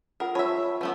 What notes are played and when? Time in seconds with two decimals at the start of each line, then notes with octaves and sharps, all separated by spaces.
0.20 F4 A4 A#4 F#5
0.35 F4 C#5 E5 A5 B5
0.81 E3 A3 B3